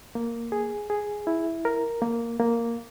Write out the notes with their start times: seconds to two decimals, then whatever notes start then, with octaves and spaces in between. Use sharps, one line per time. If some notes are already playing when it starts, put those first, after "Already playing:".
0.15 A#3
0.52 G#4
0.90 G#4
1.27 E4
1.65 A#4
2.02 A#3
2.40 A#3